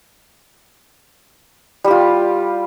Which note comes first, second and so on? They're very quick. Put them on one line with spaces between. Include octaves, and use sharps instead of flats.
G3 G4 F4